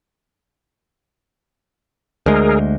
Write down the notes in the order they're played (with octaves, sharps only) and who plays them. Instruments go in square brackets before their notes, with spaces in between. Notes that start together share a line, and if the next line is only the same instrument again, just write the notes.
[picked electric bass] D2 G#3 [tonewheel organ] G#4 A#4